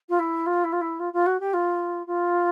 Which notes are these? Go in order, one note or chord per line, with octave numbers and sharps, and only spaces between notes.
F4
E4
F4
E4
F4
E4
F4
F4
F#4
G4
F4
F4